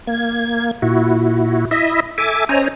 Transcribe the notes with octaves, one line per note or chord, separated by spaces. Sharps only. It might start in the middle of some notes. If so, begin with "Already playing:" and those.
A#3 G#6
A#2 E4 F#4
E4 D#5 E5
A4 E5 G#5 D6
C#4 C5 C#5 D#5 G#5 A#5